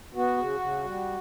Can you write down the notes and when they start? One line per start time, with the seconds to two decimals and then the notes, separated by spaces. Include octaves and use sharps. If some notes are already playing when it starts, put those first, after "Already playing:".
0.15 B3 F#4
0.37 C#3
0.60 C#3
0.84 G3